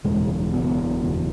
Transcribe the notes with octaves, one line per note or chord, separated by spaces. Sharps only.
F#1 E2 B2 G#3
F#1 E2 B2
F#1 E2 B2